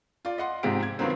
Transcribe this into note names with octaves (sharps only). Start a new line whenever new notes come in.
F4 D5
D#5 F#5 C6
G#2 C3 F3 G4 G#4 D7
G#6
G2 D#3 F3 F#3 B3 C4